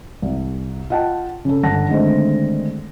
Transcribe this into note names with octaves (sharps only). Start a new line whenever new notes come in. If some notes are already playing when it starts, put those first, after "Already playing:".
C2
F4 D#5 F#5 G5 A5
C#3 A4
G1 F#5 A5 A#6
D3 D#3 G#3 A3 C4